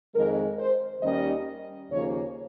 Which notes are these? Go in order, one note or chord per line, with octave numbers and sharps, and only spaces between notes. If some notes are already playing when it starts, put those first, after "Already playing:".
F2 D#3 G#3 A#4
C5
D#2 D#3 G3 C#4 D#5
D#2 C#3 F3 A#3 C#5